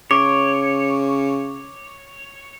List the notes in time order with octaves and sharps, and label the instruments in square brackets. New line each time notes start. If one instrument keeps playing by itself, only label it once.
[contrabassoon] C#3 [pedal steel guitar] C#5 [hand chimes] D6